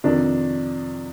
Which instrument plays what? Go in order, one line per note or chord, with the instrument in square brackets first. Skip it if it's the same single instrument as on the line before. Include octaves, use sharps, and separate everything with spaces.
[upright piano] F2 C3 D#3 D4